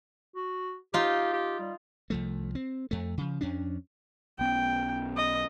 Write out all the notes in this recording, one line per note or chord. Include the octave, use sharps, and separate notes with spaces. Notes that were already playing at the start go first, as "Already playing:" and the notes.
F#4
D#4 F4 G4
G4
G3
C2 F3 A3
C4
F2 A3
C#3 F3
F2 C#4 D4
B1 B3 C#4 G5
D#5